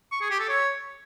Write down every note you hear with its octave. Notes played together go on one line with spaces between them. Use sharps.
C#6
G#4
G4
A4
C#5